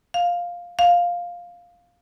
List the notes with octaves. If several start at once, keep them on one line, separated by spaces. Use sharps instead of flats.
F5
F5